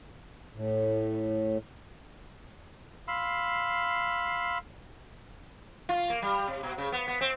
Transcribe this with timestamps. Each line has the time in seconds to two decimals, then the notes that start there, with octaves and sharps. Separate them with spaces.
0.53 A2
3.08 F5 B5 C6 E6
5.89 F4
6.10 A#3
6.22 G3
6.48 C3
6.63 B2
6.78 C#3
6.92 B3
7.08 B3
7.21 C4